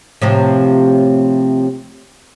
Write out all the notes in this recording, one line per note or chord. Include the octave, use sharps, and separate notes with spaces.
A2 C3 F3